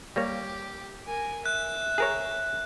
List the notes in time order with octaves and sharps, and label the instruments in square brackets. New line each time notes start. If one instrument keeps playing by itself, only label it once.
[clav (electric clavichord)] G3 A#3 C#5 [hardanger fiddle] G4
[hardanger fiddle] A#4 G#5
[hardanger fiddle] E5 [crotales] F#6
[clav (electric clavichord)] G#4 A#4 C#5